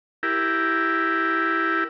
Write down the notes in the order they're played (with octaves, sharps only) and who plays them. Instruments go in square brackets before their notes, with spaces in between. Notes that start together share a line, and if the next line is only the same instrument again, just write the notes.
[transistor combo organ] E4 G4 A#4